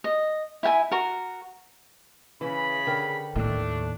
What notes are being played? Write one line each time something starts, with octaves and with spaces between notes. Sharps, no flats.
D#5
E4 E5 G5 G#5
F#4 A#4
C#3 E3 B5
D3 A#4 G5
D#2 A2 A3 D4